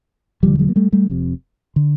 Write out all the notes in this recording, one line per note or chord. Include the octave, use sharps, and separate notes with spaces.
E1 D2 D3 F3 G3
F#3 G#3
A#3
G3 A3
G3 A3
F1 F2 C3
D3